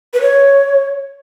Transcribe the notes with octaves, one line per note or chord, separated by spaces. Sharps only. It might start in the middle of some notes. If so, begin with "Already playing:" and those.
B4
C#5